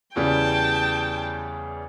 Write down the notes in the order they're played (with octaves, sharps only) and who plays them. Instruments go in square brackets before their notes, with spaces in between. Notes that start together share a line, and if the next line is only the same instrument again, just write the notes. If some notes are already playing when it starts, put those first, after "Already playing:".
[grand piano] E2 C#3 G3 [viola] G5 A5